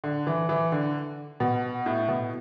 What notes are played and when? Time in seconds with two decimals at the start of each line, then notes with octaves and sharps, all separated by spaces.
0.04 D3
0.27 E3
0.49 E3
0.72 D3
1.40 B2
1.86 A2
2.08 B2